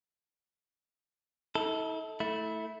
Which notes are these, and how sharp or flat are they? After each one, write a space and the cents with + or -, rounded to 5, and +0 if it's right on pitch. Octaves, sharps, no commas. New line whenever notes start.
E4 -45 A4 +0
A3 +0 E4 -15